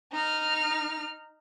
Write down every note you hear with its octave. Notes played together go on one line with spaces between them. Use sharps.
D#4 F6